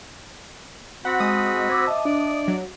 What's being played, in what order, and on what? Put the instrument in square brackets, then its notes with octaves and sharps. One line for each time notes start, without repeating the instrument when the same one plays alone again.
[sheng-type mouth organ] C4 F#4 B5 [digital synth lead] F#5
[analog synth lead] G#3 [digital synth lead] D#6
[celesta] C5 D6 E6 [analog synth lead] G#6
[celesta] D#5 E5 D6 [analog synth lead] A5
[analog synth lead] D4 [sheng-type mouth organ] D5
[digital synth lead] F#3